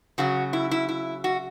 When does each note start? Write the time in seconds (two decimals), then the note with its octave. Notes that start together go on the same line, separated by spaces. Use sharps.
0.18 C#3 F#3 F#4
0.53 E4
0.71 E4
0.89 E4
1.24 F#4